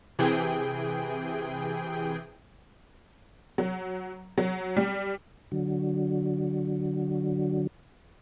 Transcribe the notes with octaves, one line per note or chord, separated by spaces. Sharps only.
C3 E3 G#4 G5
F#3
F#3
G3
D3 F#3